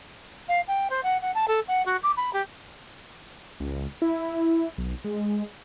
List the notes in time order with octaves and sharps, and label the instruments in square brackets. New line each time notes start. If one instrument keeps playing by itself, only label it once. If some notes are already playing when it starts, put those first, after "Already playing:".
[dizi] F5
G5
C5
F#5
F#5
A5
A4
F#5
F#4
D6
B5
G4
[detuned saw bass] C#2
E4
B1
G#3